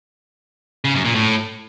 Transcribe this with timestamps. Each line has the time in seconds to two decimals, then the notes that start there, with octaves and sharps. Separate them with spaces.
0.85 C#3
0.95 F#2
1.05 A#2
1.15 A2